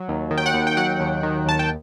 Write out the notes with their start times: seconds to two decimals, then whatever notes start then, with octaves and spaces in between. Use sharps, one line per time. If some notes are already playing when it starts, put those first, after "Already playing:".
Already playing: F#3
0.08 D#2
0.31 D#3
0.38 G5
0.46 F#5
0.54 D#2
0.67 G5
0.77 F#3 F#5
1.00 D#2
1.23 D#3
1.46 D#2 A5
1.59 G5